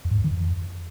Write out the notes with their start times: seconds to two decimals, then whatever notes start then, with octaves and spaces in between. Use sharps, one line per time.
0.05 F2
0.11 G#2
0.18 F2
0.24 D#3
0.31 F2